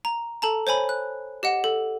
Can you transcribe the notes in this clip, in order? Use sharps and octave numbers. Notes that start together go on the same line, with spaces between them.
A#5
A4 A5 A#5
C5 C#5 G#5 B5
F#6
G4 D#5 F#5
A4